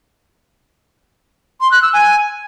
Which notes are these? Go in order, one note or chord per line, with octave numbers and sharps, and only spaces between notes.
C6
F#6
E6
G#5